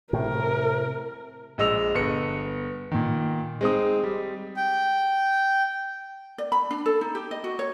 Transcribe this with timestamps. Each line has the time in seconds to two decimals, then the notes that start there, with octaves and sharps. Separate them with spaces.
0.13 A2 C3 A#4
1.58 A#1 G#3 D#5 E6 F7
1.95 G1 B3 C#7
2.92 A#2 D#3
3.61 G#3 C4 D#4 D#6
4.04 G3
4.57 G5
6.38 D5
6.52 B5
6.71 D4
6.86 A4
7.01 D#4
7.15 G4
7.31 D#5
7.44 F#4
7.59 C#5